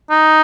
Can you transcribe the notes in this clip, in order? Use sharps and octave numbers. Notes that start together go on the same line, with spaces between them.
D#4